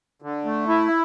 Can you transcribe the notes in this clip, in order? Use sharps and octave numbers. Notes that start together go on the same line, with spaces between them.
D3
A3
E4